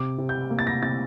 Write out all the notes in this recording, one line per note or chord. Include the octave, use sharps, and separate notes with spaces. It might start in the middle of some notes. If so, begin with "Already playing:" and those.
Already playing: C3 D6
C3
G6
A#3
A6
A#6
C3 A6